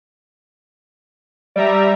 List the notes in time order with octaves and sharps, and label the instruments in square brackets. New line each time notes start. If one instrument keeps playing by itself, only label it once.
[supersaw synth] G3 E5 A#5 [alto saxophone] D5